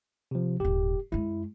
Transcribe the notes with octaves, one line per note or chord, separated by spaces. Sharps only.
C3 F3
D#1 G#2 G4
F#2 G#3 E4